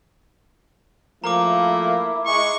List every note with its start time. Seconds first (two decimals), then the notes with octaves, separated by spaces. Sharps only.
1.24 F3 A3 A#3 E4 A#5 D6
2.26 G#3 C#6